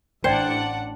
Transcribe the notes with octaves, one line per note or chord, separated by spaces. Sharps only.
A1 D4 C5 D5 F#5 G5